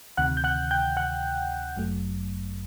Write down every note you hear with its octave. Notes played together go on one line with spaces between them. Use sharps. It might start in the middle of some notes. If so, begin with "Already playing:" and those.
D2 C3 D#3 F#5 F#6
G6
F#5 F#6
G5 G6
F#5 F#6
G1 F#2 F#3 A3